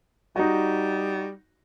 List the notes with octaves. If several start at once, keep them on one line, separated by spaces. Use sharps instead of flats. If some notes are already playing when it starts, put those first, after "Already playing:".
G3 D#4 F#4